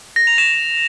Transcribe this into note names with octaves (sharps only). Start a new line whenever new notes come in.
A#6
F7
E7